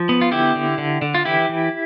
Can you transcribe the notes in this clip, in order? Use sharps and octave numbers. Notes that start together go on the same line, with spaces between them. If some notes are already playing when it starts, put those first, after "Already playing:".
Already playing: F3
B3
F4
D3 E4 G4
D3
D3
D3
F4
E3 E4 G4
E3